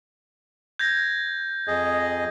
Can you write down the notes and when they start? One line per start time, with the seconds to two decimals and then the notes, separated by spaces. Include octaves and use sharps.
0.79 G6 G#6 A#6
1.68 F2 G#4 D#5